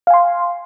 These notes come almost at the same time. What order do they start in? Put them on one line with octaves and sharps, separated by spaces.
F5 G#5 C6